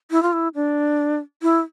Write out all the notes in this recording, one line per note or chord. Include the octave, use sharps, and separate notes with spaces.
E4
F4
E4
D4
E4